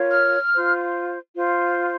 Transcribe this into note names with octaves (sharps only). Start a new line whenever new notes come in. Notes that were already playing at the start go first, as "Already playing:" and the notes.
Already playing: F4 A#4 C#5
F6
F4 C5
F4 C5